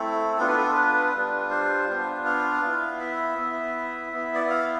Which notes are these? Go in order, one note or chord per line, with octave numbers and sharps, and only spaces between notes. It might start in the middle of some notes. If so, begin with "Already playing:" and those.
Already playing: A3 C4 E4 A4
B3 D4 F4 A4
B4
A4
B4
G3 D4 F4
C5
B3 D4 F4
F5
B3 E4
E5
B3 E4
B3 E4
D5
E5
F5